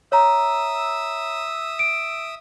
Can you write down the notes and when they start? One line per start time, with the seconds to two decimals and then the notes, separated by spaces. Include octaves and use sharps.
0.12 C#5 E5 A#5 D#6 E6
1.79 D7